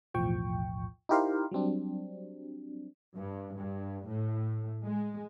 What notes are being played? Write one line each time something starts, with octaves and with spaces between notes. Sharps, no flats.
B1 E2 A2 F3 G5 C#6
D#4 E4 G4 A#4 C5 F5
F#3 G3 C4 D4
G2
G2
A2
G#3